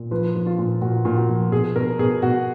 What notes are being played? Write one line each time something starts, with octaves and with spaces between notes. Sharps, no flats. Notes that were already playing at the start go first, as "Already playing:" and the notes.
Already playing: A#2
F3 B4
F3
F4
A#2
A#2 F#4
A#2
F#4
F3
B2 G#4
B2 A#4
B2 G#4
B2 F#4